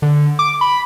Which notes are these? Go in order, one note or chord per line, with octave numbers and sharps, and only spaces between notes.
D3
D6
B5